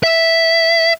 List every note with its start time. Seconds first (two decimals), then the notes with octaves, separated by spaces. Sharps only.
0.04 E5